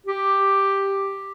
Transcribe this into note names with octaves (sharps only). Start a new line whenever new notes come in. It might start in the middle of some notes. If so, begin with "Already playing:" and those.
G4